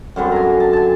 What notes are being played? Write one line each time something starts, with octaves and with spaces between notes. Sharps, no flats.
F#2 D3 G3 C4
G#5 A#5
A5
G#5 A5